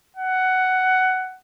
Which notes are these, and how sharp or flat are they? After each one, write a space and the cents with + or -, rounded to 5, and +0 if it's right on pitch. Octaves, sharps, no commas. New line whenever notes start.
F#5 +10